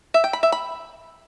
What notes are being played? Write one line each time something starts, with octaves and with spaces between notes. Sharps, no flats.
E5
G5
B5
E5
B5